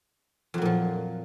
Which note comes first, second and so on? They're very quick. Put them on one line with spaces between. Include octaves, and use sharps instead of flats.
F2 F#3 A#2 F3